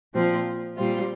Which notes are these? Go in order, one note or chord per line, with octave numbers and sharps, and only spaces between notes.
A#2 F3 C4 F4
A#2 G3 C4 F4